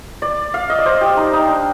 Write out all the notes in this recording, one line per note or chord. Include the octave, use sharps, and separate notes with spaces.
D5
F5
D#5
D5
C5
G4
D#4
D#4
D4